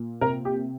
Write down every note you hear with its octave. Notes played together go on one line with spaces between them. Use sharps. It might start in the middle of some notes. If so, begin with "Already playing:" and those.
Already playing: A#2
C3 A#4
G4